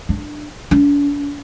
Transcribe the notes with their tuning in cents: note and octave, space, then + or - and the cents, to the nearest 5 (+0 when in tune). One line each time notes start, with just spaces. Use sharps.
D4 +15
D4 -40